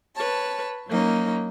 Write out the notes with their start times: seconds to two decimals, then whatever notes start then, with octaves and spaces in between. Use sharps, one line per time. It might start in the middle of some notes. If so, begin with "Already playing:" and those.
0.15 B4 C#5 A5
0.89 F#3 A#3 C#4 D#4